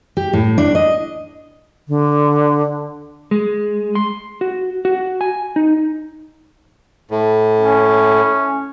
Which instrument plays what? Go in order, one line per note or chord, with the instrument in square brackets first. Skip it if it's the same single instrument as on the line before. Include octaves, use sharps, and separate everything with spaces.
[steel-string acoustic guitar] G4
A2
D4
D#5
[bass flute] D3
[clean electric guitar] G#3
C6
F#4
F#4
G#5
D#4
[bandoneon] A2
[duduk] C#4